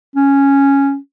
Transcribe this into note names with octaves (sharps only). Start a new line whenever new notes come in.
C#4